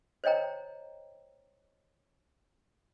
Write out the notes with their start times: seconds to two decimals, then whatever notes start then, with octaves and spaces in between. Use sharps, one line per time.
0.24 C5 C#5 D#5 G5 A#5